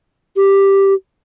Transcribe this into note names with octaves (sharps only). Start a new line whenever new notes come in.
G4